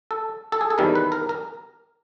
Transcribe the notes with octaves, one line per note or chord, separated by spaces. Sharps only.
A4
A4
G#4
A4
E2 C3 D#3 G3 A#4
B4
A#4
A#4